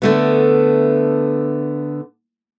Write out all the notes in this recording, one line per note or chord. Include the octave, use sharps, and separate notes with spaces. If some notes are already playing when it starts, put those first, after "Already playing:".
D3 A3 B3